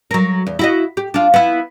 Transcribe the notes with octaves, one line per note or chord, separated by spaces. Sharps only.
F#3 A#4
E2
E4 F#4 D#5
G4
D4 F4
B3 E4